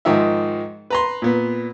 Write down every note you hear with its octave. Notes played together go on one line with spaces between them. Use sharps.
G#2 D#3 F3 D#4 E5
B4 A#5 C6
A#2 B3